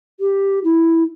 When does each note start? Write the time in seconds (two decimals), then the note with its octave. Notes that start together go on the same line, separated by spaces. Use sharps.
0.20 G4
0.64 E4